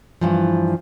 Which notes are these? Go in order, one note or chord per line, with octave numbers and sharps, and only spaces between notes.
G2 E3 F3